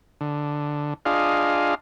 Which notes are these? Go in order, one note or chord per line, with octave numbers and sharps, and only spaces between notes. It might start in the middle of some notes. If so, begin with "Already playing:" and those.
D3
D4 F4 G#4 D#5 F5